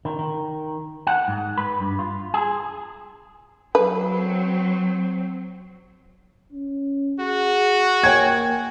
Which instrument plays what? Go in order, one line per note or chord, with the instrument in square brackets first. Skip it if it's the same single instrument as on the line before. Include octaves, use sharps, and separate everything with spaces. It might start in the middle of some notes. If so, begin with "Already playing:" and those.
[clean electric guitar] D#3
D#3
F#5
G#2
B4
G2
F4
G#4
[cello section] F#3 C4 [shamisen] B4
[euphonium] C#4
[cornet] F#4 [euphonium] G#4
[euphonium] A#3 [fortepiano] C#5 G5 G#5 [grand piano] G#6